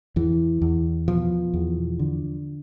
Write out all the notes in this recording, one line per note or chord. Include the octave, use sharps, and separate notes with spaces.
E2 E3
E2
B2 F3
E2
D3